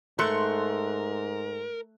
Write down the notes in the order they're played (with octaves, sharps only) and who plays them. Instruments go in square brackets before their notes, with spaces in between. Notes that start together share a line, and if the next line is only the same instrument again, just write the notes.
[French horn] G#2 [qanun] A3 [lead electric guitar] A#4 [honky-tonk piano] C6 F#6 C#7